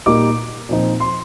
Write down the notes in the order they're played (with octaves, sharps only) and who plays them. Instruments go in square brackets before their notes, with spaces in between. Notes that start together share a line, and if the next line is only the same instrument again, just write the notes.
[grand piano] A#2 G3 A#3 D#4 D6
A#2 F3 C4 D#4
C6